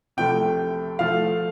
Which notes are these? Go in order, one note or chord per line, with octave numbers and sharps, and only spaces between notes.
C2 C3 F3 A3 G5
F3 A3 F5